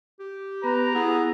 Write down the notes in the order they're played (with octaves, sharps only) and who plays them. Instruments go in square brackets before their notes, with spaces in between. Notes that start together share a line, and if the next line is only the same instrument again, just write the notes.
[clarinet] G4
[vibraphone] B3 [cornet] B4 [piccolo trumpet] A#5
[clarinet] B3 [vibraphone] E4 [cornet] G#4